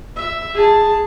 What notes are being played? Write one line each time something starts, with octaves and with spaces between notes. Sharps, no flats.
E5
G#4 A5